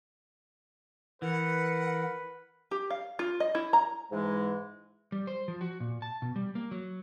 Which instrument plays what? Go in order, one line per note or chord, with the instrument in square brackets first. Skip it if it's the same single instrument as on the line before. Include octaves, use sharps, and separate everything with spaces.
[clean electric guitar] E3 [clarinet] A#4 [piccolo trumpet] B4 [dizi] F#5
[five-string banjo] G4
F5
F4
D#5
E4
A#5
[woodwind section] G#2 E3 G#3
[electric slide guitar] G3
C5
F3
F#4
A#2
A5
B2
G3
A#3
F#3